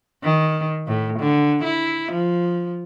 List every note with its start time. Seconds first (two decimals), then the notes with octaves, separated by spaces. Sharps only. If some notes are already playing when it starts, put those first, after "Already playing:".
0.23 D#3
0.87 A2
1.19 D3
1.64 E4
2.12 F3